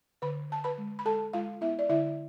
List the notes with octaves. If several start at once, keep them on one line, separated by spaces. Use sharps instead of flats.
D3 B4 B5
D3 A5
B4 B5
G#3
B5
G#3 A4 A5
G#3 F4 F5
B3 E4 E5
D5
D3 E4 E5